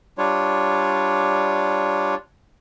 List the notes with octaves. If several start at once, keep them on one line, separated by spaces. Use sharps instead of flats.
G3 D4 F4 C#5